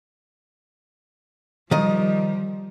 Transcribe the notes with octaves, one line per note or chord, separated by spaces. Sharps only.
D#3 F3 G3 D#5